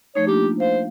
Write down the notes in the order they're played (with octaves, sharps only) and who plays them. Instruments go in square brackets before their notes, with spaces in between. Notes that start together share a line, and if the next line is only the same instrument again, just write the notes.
[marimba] F3 A3 D#4 [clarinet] C#5
[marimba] A#3 D4 F4 [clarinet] G4
[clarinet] C5 [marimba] F5